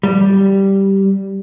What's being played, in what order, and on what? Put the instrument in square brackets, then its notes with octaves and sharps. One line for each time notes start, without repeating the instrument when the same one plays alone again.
[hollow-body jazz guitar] G3